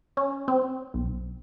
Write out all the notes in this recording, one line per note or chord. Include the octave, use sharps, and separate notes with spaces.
C#4
C4
B1